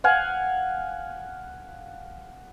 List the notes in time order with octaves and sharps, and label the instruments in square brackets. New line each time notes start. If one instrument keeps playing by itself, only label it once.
[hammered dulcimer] F5 F#5 G#5